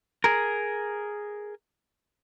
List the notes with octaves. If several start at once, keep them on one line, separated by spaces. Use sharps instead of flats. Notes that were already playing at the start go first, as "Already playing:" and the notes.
G#4 A#4